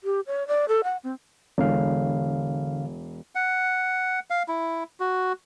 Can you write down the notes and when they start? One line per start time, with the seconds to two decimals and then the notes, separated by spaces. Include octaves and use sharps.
0.04 G4
0.27 C#5
0.48 D5
0.68 A4
0.84 F#5
1.04 C4
1.58 E1 D3 F5
3.35 F#5
4.30 F5
4.48 E4
5.00 F#4